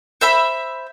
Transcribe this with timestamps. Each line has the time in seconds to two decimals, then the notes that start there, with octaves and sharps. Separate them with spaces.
0.21 C5 E5 B5